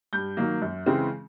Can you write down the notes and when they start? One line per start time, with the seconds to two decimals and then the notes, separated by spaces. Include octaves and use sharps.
0.13 G2 G6
0.37 D#3 F#3 A#3
0.62 F#2
0.86 C#3 E3 G#3 C4